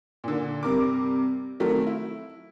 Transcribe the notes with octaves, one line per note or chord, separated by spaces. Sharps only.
A#2 D3
G2 C3 A#4 D6
D#3 F#3 A3 C4 A#4
E4